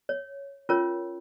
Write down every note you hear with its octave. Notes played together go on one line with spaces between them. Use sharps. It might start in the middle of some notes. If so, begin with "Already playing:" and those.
C#5
C#4 F4 A#4 C#5